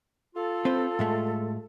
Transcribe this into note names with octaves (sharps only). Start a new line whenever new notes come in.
F4 A4
C4 B4 C5
A2 G#3 A3